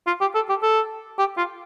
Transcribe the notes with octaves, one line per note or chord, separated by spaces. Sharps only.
F4
G4
A4
G4
A4
G4
F4